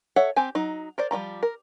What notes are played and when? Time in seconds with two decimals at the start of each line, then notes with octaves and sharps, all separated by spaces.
0.16 A4 C#5 E5 F#5
0.36 C4 G4 G#5
0.55 F#3 D#4
0.98 A#4 C5 D5
1.11 F3 G3 A#3 A#5
1.43 A#4